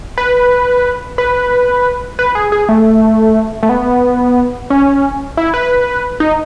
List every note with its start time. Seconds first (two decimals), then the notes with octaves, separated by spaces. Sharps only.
0.18 B4
1.18 B4
2.19 B4
2.35 G#4
2.52 G#4
2.69 A3
3.63 A3
3.69 B3
4.70 C#4
5.37 E4
5.54 B4
6.20 D#4